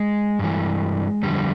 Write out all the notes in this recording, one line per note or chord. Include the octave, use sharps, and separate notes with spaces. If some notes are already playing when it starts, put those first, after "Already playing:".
Already playing: G#3
G2 E3
F2 D3 G3